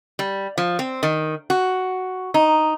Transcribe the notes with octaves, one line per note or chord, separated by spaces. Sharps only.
G3
F3
C4
D#3
F#4
D#4